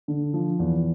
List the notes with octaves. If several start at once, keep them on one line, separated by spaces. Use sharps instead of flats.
D3
F3
E2